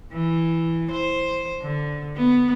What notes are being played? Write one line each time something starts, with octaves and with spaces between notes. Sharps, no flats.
E3
C5
D3
B3